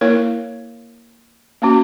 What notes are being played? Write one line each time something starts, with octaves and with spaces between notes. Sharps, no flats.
A#3 E4 A#4 C#5
A#3 C#4 F#4